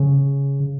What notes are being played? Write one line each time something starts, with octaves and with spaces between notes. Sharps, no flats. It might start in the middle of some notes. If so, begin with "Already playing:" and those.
Already playing: C#3